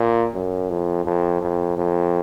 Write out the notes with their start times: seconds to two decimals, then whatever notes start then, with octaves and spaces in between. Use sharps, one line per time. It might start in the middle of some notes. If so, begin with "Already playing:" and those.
Already playing: A#2
0.34 F#2
0.70 F2
1.05 F2
1.41 F2
1.77 F2